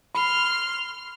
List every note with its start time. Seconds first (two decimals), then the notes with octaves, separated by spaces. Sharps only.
0.15 B5 C6 F6